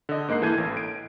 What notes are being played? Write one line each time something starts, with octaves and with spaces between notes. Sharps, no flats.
D3 D#5
G#2 A#3 D#5 F#6 C7
E3 A#3 A4 G6 G#6 D#7
A1
D7